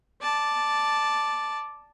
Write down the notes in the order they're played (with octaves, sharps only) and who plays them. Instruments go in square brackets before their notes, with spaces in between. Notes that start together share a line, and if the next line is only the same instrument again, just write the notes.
[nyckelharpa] D5 A5